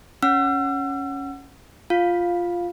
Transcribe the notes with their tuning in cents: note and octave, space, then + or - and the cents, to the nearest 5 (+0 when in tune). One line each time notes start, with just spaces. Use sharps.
C#4 +0 F#5 +0 E6 +40
F4 +0 F5 +10